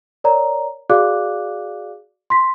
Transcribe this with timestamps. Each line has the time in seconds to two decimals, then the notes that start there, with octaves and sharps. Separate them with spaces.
0.24 A#4 C#5 D5 A#5
0.90 F#4 G#4 D5 F5 D6 F#6
2.30 C6 B6